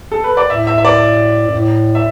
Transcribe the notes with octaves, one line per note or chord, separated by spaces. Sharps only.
A4
B4
D5
A2 E5
E5
E5
D5
F#2
A2
E5